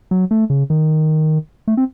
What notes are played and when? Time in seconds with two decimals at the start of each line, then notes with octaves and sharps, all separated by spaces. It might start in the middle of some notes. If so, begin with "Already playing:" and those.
0.11 F#3
0.31 A3
0.50 C#3
0.70 D#3
1.67 A3
1.77 C4